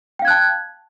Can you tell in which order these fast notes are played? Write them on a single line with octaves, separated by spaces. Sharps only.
G5 F5 G#6 F#6 A5